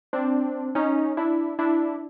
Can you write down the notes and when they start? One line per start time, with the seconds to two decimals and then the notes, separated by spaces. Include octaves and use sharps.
0.13 C4 D4
0.75 C#4 D#4
1.17 D4 E4
1.59 D4 E4